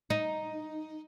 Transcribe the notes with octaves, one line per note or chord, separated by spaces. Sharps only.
D#4